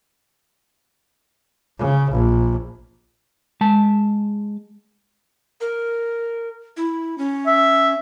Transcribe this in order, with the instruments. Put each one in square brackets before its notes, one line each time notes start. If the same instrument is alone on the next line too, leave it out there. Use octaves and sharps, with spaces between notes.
[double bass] C#3
A#1
[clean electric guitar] G#3 A5
[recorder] A#4
E4
C#4
[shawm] E5